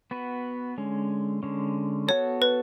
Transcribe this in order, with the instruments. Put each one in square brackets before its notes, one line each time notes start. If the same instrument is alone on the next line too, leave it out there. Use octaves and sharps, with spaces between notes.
[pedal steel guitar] B3 F#4 B4
D3 G#3 C#4
D3 G#3 C#4
[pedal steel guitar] B3 F#4 A4 [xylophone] C#5
[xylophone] B4